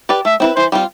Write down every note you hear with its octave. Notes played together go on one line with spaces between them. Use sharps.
G4 B4 D5
A3 E5
C4 E4 B4
E3 C5
G3 C4 F4